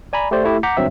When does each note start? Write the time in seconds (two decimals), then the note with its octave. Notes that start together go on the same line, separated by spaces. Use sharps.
0.13 D5 G#5 A#5 B5
0.31 A3 G4 C5 D5
0.44 A3 E4 G4
0.63 F#5 A#5 D6 G6 B6 C#7
0.77 G#1 G2 F#3 C4 E5